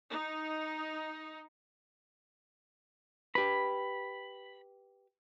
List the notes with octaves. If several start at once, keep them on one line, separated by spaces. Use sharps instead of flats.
D#4
G4 B4 B5